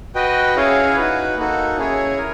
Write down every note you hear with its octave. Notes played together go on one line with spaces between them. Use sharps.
F#4 B4 D#5 G5
C#4 E4 G#4 C#5 F5
D#4 F#4 B4
A#3 D#4 F#4 A4
C#4 E4 G#4 C#5
A#4